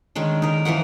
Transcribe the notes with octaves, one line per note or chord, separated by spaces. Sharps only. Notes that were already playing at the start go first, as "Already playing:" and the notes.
D#3 G#3 C#4 D4
D#4 A#4
E3 F3 A#4 F#5